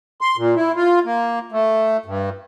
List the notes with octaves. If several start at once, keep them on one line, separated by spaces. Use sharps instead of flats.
C6
A#2
E4
F4
A#3
A3
G2